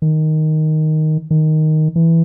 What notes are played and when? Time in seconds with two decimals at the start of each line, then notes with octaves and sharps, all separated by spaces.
0.02 D#3
1.31 D#3
1.96 E3